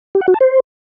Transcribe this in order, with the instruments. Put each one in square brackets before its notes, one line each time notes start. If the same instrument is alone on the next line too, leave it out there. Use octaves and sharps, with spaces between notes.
[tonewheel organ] G4
F#5
F#4
A5
C5